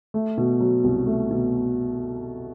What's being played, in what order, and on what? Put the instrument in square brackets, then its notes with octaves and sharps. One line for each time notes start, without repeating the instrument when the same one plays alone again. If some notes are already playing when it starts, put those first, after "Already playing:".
[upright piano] A3
B2
F#3
C2
A3
B2